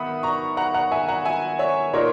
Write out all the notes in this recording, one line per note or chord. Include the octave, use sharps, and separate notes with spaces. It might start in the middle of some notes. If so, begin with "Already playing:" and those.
Already playing: D#3 B3 E5 F#5 B5 D#6
A#5 C#6
F#5 A#5
F#5 A#5
E5 G#5
F#5 A#5
E5 G#5
C#5 E5
A#2 A#3 D#4 A#4 C#5